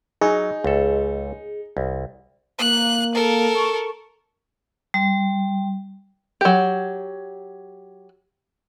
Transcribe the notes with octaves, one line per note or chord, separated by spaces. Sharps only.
F#3 D#4 G#4
C#2 A4
C2
A#3 F#6
A4 A#4
C#6
G3
F#3 G4